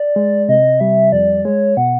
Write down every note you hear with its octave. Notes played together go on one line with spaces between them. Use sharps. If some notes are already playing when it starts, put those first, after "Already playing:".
Already playing: D5
G#3
C3 D#5
G3 E5
F2 D5
G#3 C#5
B2 F#5